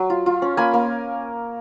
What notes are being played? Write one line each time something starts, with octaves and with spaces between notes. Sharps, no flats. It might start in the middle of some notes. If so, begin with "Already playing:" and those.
Already playing: F#3
F4
F4
C#4
A#3 G#5 B5
A#3